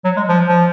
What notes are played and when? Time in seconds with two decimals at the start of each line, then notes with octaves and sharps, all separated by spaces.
0.05 F#3
0.17 G#3
0.29 F3
0.48 F3